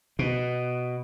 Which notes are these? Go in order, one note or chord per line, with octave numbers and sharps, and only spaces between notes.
B2